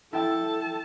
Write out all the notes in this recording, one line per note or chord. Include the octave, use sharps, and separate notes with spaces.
E4 A4 G5 A5 E6